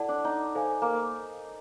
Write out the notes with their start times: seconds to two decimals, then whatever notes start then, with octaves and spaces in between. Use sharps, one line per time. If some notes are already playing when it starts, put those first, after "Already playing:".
Already playing: E4 A4 D5 F#5 A5
0.09 D4
0.25 D#4
0.55 A4 C5 F5 G#5
0.82 A#3